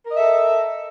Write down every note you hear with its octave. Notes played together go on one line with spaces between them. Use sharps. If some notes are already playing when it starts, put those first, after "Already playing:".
A4 A#4 D#5 E5